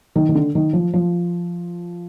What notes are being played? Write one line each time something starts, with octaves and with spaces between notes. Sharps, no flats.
D#3
D#3
D3
D#3
F3
F3